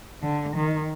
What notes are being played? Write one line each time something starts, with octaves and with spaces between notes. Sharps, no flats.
D3
D#3